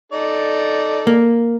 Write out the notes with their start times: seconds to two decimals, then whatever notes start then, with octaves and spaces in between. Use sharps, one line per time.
0.12 D#4 A4 D5
1.07 A#3